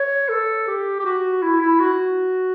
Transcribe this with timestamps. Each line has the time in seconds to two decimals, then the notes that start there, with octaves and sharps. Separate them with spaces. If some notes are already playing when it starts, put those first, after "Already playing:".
Already playing: C#5
0.29 A4
0.67 G4
0.99 G4
1.05 F#4
1.42 E4
1.61 E4
1.80 F#4